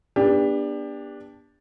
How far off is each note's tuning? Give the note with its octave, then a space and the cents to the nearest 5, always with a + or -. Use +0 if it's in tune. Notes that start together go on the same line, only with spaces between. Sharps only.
B3 -30 D4 +0 G4 +25